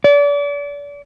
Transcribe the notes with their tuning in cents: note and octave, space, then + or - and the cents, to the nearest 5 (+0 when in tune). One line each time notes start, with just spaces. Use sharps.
D5 -35